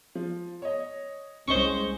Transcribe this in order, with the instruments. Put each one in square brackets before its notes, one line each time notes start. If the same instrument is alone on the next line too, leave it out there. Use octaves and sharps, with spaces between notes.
[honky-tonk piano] F3
C#5 D#5
[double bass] C2 G#3 [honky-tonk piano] C#4 D#5 [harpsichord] C5 C#6